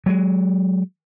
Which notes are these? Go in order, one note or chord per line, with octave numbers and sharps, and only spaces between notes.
F#3 G#3